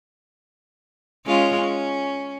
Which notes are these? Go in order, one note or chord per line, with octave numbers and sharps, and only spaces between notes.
G#3 C#4 F4
C#4